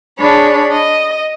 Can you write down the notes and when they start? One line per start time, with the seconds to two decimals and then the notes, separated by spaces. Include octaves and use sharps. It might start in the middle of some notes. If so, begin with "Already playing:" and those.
0.18 D4 G#4 C#5 B5
0.70 D#5